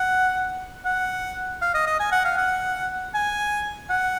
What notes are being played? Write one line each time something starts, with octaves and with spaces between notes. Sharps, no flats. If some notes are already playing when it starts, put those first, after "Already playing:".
Already playing: F#5
F#5
F5
D#5
D#5
G#5
F#5
F5
F#5
G#5
F#5